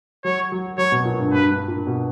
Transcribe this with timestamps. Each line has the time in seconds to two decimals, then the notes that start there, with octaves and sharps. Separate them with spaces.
0.25 F#3 C#5
0.52 F#3
0.78 F#3 C#5
0.92 B2
1.05 A#2
1.20 G2
1.32 G2 B4
1.51 G2
1.68 A#2
1.87 B2